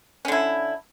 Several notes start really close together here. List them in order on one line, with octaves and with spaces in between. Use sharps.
C#4 D3 E4